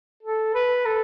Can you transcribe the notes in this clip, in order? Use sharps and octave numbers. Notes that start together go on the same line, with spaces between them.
A4
B4
A4